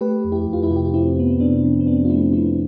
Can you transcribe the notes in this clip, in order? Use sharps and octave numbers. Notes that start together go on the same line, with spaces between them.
A3 G4 B4
F2
E4 G4
F2
F4
E4 G4
C3
G4
F4
F2 C4 E4
F2 B3
C4
C3 B3 D4
F3
C4
F2 B3 D4
F4
A3 C4 E4
A3 C4 E4